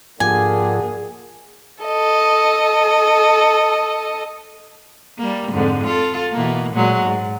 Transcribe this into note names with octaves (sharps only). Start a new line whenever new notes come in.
G#2 D3 F3 A#3 F4 G4 G#4 G#5
A4 D#5
G3 A#3
F2 G#2 D3
F4 A4
B2 E3 A#3
A#2 F#3 G#3
G#2